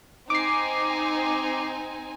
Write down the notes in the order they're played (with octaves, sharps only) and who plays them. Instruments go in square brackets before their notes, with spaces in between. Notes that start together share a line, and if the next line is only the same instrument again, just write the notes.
[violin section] C4 D#4 G#5 [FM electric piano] D6 C7